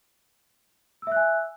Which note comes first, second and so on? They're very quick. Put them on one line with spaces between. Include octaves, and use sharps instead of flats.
E6 E5 F#6 G#5